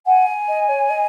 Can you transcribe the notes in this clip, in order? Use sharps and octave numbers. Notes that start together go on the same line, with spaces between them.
F#5 G#5
D#5
C#5
D#5